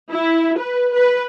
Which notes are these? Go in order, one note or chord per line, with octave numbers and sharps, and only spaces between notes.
E4
B4
B4